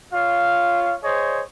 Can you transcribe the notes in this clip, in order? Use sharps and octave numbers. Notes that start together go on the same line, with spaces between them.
F4 C#5 F5
G#4 C5 C#5 D#5